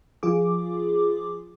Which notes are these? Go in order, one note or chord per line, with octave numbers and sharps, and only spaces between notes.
F3 F4 G#4 D6